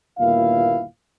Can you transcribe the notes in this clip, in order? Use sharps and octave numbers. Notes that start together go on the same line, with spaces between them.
G1 D#2 A#2 B3 E4 F5